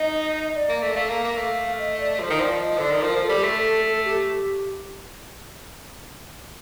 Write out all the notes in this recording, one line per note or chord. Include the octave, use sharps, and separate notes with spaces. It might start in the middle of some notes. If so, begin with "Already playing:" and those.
Already playing: D#4 D#5
D5
A#3
A3
A3 F5
A#3
F5
A#3
A3
D#5
D5
F3 C5
D#3
F3 D5
D#5
D3 D5
D#3
F3 A#4
F3
A4
G3
A3 A4
A4
G4